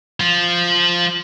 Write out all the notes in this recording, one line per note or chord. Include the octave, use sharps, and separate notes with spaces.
F3 F4